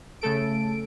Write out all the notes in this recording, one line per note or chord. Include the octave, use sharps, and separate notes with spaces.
C#3 A3 A4 D7